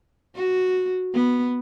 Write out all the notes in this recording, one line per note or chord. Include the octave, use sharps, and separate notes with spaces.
F#4
B3